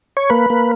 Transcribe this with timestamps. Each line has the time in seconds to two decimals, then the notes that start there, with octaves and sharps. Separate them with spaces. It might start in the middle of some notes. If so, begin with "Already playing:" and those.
0.17 C#5
0.30 A#3 B4
0.50 A#3